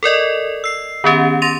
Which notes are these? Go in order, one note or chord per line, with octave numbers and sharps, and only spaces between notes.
A4 A#4 D5 D#5
E6 C7
D#3 B3 C#4 G4
C6 A6 A#6 D#7 F7